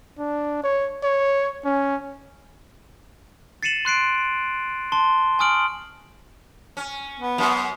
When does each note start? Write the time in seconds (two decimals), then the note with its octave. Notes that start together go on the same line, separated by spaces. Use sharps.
0.19 D4
0.64 C#5
1.03 C#5
1.65 C#4
3.63 A6 C7 C#7 D#7 E7 F#7
3.85 C6 F#6 C7 D7
4.92 A5 C6 G7
5.39 G#5 C#6 D#6 F6 D7 F#7
6.77 C#4
7.19 B3
7.38 F#2